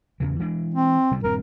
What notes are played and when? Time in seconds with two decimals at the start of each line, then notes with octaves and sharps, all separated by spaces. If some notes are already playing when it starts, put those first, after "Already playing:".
0.20 E2 C#3 E3
0.39 E3 G#3 D4
0.74 C4
1.11 C3 G3
1.24 D#1 G2 C4 A#4